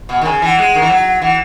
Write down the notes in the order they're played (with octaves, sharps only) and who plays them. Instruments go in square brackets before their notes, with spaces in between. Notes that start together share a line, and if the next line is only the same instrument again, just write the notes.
[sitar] B2 [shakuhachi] F#5
[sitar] D#3
[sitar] C#3 [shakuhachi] G#5
[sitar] E3 [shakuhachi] F#5 G#5
[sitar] G#3
D#3
E3
F#3
[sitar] E3 [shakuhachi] F#5